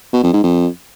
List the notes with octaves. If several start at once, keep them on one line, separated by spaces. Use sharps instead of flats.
B2
F2
G#2
F2